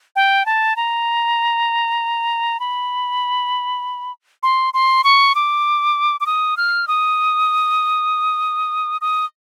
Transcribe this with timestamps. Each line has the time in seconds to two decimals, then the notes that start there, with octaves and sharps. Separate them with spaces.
0.16 G5
0.46 A5
0.76 A#5
2.60 B5
4.43 C6
4.74 C6
5.04 C#6
5.35 D6
6.20 D6
6.26 D#6
6.57 F6
6.88 D#6
9.01 D#6